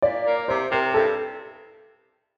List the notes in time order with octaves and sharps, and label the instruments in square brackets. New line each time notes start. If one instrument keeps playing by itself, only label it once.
[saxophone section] A#2 [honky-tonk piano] D5
[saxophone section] A#3
[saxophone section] C3 [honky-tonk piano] C5
[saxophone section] C3 [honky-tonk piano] A#4
[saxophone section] G2 [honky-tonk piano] A4